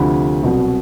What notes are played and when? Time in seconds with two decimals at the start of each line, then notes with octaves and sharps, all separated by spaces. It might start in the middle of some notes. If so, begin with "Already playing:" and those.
Already playing: D2 C3 F3 B5
0.43 C2 B2 F#3